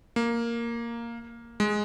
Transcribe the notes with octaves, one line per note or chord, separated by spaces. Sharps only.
A#3
G#3